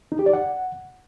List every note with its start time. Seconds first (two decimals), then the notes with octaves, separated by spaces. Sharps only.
0.12 D#4
0.19 G4
0.26 D5
0.33 F#5